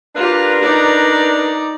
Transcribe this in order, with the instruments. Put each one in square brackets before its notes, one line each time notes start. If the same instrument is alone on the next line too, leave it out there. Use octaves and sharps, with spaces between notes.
[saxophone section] D4 A#4 B4 [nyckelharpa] F4 G4
[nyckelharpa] D#4 D5